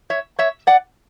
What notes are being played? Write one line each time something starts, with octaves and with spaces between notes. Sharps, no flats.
C#5 E5
C#5 E5
D5 F#5